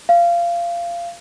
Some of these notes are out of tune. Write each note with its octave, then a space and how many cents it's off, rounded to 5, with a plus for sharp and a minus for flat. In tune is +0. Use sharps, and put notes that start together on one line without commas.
F5 -20